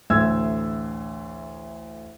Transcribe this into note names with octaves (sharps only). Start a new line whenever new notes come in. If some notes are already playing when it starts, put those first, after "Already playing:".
A1 D2 A3 E6 G#6